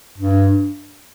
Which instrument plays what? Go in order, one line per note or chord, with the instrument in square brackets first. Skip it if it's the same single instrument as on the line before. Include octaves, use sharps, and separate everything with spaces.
[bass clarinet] G2